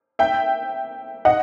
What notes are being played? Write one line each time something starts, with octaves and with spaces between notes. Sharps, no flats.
E5 G5
D#5 F#5